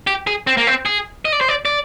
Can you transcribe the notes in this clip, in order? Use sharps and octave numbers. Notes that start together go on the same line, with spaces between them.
G4
G#4
C4
A#3
C4
G#4
D#5
D5
C5
D5
D5